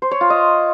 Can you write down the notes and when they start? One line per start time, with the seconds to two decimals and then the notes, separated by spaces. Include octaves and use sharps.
0.02 C5
0.11 C#5
0.21 F4
0.30 D#5